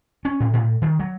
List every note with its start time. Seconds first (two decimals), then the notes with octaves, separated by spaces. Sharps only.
0.25 C#4
0.40 A2
0.54 A2
0.82 D#3
1.00 F#3